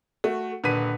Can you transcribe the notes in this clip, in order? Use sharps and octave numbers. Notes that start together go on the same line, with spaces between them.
A3 F#4
D#1 A#2 D3 B4 B6 D#7